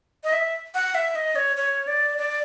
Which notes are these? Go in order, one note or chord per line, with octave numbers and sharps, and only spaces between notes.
D#5
E5
F#5
E5
D#5
C#5
C#5
D5
D5